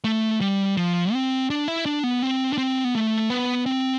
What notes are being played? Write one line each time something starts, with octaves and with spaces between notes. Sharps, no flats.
A3
G3
F3
C4
D4
E4
D4
B3
C4
D4
C4
B3
A3
B3
C4